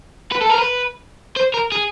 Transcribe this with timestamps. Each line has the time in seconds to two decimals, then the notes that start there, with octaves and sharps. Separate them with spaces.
0.32 B4
0.41 A4
0.50 A#4
0.58 B4
1.36 C5
1.54 A#4
1.72 G#4